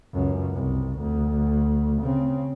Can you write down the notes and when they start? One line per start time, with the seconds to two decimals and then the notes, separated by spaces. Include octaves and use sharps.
0.13 C#2 F#2
0.53 C2
1.00 D2
2.02 C#3 C4